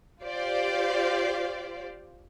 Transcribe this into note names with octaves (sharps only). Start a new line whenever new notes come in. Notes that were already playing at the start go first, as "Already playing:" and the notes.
F4 G4 C5 D5 F5